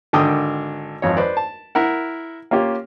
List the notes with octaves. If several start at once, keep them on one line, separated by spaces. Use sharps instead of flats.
G#1 D3 G5 D6 D#6
G#1 F2 C#5
B4 C5 D5
A5
E4 A#4 F#5
A#3 C#4 F4 G4